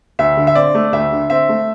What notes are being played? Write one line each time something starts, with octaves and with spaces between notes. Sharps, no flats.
D2 E5
D3
E5
C4 D5
A3
D2 E5
D3
C4 E5
A3